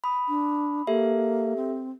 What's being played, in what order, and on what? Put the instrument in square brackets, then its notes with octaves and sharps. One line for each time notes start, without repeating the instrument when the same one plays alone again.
[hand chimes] B5 D#6
[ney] D4
[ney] A#3 [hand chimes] G4 A4 E5
[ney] C4